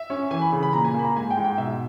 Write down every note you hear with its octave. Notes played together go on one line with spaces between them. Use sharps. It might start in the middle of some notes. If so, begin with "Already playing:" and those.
Already playing: E5
C#4
E3 G#5
B5
C#3
B5
A#2 A#5
G#5
A#3
B5
A#5
G#2 G#5
G5
G#2
G5
B2 E5